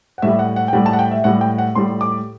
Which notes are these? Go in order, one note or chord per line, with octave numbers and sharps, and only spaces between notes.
F#5
A2 G3 E5
F#5
F#5
G5
A2 G3 F#5
A5
F#5
G5
E5
A2 G3 F#5
G5
F#5
A2 G3 C6
D6